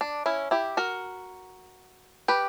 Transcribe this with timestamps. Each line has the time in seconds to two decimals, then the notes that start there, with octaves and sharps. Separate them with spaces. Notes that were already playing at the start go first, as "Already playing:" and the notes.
0.01 D4
0.26 C#4 E4
0.51 E4 G4
0.77 F#4 A#4
2.28 G4 B4